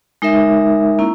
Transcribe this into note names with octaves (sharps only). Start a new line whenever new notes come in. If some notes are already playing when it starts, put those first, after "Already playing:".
G#3 D#4 A#4 E5
A#3 C#4 E4